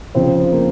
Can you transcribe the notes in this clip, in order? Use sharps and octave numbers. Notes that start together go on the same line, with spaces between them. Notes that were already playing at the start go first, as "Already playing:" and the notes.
F1 F2 C#3 F3 C4 C5
A#3 A#4